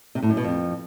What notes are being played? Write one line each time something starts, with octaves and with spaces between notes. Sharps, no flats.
C3
A2
F#2
B2
F2